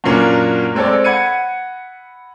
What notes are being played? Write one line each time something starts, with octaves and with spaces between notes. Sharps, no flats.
F#2 A#2 A#3 C#4 D4
G#3 C4 A4 C#5 D5
F#5 B5 G#6 C#7 D#7